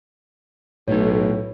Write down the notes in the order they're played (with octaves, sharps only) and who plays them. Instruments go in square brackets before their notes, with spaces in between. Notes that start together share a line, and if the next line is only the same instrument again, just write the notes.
[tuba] B1 [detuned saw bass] A2 [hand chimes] D#4 C#5